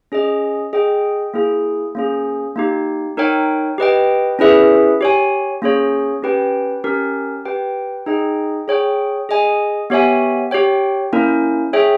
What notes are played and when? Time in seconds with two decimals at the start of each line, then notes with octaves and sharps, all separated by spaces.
0.12 C#4 G#4 D#5
0.73 G#4 D#5 G5
1.34 A#3 E4 G#4
1.95 A#3 C#4 G#4
2.56 A#3 D#4 G4
3.17 D#4 A#4 C#5 G5
3.78 G4 B4 D#5 G5
4.39 C#4 E4 G#4 B4 E5
5.01 G4 C#5 G#5
5.62 A#3 C#4 G#4 C#5
6.22 C#4 G4 B4 G5
6.84 C#4 G4 A#4
7.45 G4 B4 G5
8.06 D#4 G#4 D#5 G5
8.68 G#4 C#5 G5
9.29 G#4 D#5 G#5
9.90 B3 G4 C#5 E5 G#5
10.51 G4 C#5 G5
11.13 A#3 C#4 E4 A#4
11.73 G#4 C#5 E5 G5